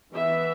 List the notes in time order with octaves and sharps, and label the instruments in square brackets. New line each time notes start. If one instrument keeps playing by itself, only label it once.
[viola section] E3 B3 E5